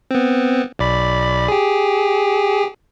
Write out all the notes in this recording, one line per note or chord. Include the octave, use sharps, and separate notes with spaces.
B3 C4
B1 D5 B5
G4 G#4